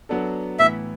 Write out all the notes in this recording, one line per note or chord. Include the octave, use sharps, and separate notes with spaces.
F#3 B3 D4 A4
A2 E3 B3 E4 E5